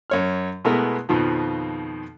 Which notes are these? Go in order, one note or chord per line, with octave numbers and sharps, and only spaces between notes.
F#2 C#5 F6
B2 G#3 A3 B3 E4 A#4
F2 B2 D#3 F3